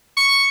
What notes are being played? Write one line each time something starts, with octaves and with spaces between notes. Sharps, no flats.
C#6